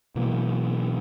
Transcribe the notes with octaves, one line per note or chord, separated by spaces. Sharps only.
B2 E3 F#3 A#3